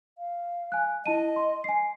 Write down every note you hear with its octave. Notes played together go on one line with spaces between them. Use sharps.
F5
G#5 F#6
E4 D#5 A5 D#7
C6
G#5 C7